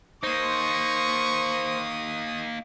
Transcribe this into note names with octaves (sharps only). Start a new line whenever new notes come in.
A#3 D#4 C5 C#6 D#6